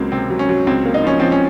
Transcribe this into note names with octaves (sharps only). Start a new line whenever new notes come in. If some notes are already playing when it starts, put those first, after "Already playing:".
Already playing: C#2 F#3 A#3 C4
C3 C4
F#3
C#4
F#3
C#2 C4
A#3
D#4
F3 C#4
F3 C4
C#4